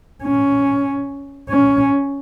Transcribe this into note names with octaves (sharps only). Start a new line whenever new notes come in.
C#4
C#4